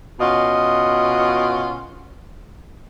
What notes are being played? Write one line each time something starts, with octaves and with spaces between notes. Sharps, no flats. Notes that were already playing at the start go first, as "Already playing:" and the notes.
B2 C#4 F4 D#5 F#5